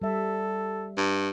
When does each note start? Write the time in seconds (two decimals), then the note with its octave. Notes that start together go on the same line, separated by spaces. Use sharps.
0.02 G3 A4 E5
0.97 G2